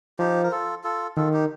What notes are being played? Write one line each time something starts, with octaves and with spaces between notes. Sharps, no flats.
F3 D#4 G4
A#4
F4 A4
F4 A4
D#3 F4 A4
D#4 G4